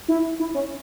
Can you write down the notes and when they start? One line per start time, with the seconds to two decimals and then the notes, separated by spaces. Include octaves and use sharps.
0.08 E4
0.40 E4
0.54 C#4